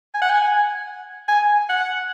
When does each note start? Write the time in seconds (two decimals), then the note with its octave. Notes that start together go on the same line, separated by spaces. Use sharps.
0.14 G#5
0.22 F#5
0.30 G#5
1.28 G#5
1.69 F#5